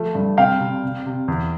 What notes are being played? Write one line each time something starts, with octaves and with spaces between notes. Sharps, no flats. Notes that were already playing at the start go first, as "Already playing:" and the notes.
Already playing: F3 A3
G2
C3 F5 G5
C3
C3
C3
E2